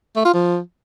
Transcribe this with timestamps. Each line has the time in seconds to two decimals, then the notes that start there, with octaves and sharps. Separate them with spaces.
0.16 A3
0.25 F4
0.34 F3